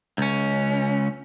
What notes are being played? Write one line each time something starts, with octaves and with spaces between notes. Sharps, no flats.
C#2 C#4